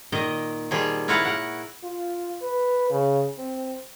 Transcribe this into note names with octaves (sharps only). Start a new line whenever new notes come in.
A#2 D#3 D#5
D#3 F3 G3 G#4
E4 F4 A#4 C#5 F5 F#5
A#4 F#5
F4
B4
C#3
C4